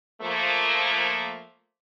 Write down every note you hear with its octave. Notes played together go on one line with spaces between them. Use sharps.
F3 A3 A#3